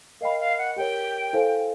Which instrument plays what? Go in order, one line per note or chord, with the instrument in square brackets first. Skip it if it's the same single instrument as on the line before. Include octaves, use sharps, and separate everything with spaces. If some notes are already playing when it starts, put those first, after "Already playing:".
[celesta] A#4 D#5 G5 B5 [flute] F5
[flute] F5
F#5
[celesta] G4 A#4 C#5 [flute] G5
[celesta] E4 A4 C5 F5 G#5